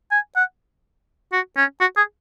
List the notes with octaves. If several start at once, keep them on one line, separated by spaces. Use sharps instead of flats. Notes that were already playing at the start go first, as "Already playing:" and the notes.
G#5
F#5
F#4
C#4
F#4
G#4